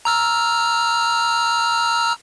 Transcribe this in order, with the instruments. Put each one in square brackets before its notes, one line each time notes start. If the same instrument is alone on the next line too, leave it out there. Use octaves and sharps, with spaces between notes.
[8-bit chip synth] A#5 E6 F6